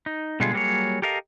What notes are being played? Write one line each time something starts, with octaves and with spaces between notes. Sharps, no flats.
D#4
B2 D3 G3 G#3 F4 G#4
F#3 G3 A#3 F4 G#4 C#5
G4 A4 A#4 D#5 F5